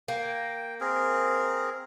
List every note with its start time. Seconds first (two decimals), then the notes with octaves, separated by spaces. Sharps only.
0.08 A#3 G5
0.81 C4 G#4 A#4